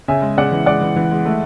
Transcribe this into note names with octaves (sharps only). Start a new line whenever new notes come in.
C#3 E5 G#5
G#3
C#3 D5 F#5
E3
G#3 D5 F#5
E3
E3
G#3
A3